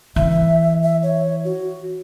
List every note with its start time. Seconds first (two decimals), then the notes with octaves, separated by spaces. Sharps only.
0.16 E3 E5
0.83 E5
1.03 C#5
1.45 F#4